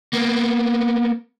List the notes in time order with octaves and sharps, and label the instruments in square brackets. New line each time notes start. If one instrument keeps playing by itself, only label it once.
[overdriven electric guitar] A#3 B3